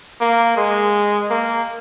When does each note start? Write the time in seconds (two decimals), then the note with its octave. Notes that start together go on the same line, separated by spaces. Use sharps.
0.21 A#3
0.57 G#3
1.30 A#3